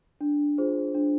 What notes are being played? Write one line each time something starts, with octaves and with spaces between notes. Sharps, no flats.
D4
F4 G#4 C5
D4